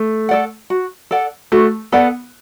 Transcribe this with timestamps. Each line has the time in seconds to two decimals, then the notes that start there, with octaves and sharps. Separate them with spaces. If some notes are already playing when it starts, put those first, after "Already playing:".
Already playing: A3
0.29 A4 D5 F#5
0.70 F#4
1.11 A4 D5 F#5
1.52 A3 F#4
1.92 B3 A4 D5 F#5